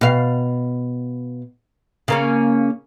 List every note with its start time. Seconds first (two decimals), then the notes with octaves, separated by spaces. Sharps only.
0.01 B2 F5
2.08 C#3 A#3 C#4